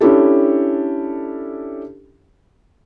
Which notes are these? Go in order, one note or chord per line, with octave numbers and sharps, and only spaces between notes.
C#4 D4 E4 G4 A4